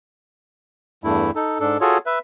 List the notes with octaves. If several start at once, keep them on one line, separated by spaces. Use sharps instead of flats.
E2 G2 A3 E4
D#4 A4
G#2 D4 A4
F4 F#4 G#4 A4 C#5
B4 E5